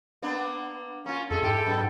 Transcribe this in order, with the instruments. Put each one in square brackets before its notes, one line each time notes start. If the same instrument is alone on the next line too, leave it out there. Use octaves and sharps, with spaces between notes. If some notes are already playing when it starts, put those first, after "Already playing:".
[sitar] A#3 B3 D4
[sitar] A#3 F4 [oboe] C#4
[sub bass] F2 [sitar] G#3 G#4 [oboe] A4
[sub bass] G#2 [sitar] G#3 E4 G4 [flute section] G5
[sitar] F#2 B2